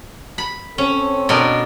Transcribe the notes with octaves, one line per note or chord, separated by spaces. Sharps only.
B5
C4 C#4 A4
B2 D4 A#4